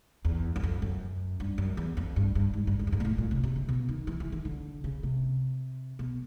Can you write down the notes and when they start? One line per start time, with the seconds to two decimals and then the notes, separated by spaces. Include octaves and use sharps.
0.25 E2
0.56 F#2
0.63 F2
0.82 F#2
1.40 G2
1.58 F#2
1.77 E2
1.97 F2
2.16 G2
2.35 G2
2.54 G#2
2.67 G2
2.79 G2
2.87 G#2
2.92 G2
3.00 A#2
3.05 A2
3.18 A#2
3.31 C3
3.43 C3
3.56 C#3
3.69 B2
3.89 D#3
4.07 E3
4.20 E3
4.32 D#3
4.45 D3
4.84 C#3
5.03 C3
5.99 B2